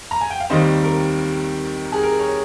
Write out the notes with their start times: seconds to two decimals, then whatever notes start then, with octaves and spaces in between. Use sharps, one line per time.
0.11 A#5
0.21 G#5
0.30 G5
0.40 F5
0.50 D#2 D#3 G3 C4 C5 D#5
0.83 A#4
1.92 G#4
2.03 A#4
2.19 A#4 C#5